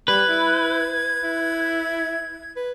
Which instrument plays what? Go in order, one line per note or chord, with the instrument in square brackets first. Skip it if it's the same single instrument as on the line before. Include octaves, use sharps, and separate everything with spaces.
[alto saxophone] G3 [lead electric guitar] B4 [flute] G#6
[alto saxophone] E4
E4
B4